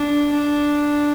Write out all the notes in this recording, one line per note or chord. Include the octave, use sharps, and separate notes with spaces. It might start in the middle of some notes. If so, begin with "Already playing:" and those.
Already playing: D4
D4